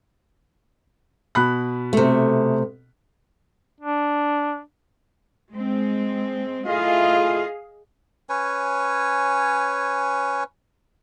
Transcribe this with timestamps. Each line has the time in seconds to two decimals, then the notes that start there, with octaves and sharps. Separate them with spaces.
1.35 B2 B5 F#6
1.93 C3 A3
3.80 D4
5.50 G#3 C4
6.66 A3 E4 F4 G#4 D#5 F5
8.29 C#4 B4 C#5 G#5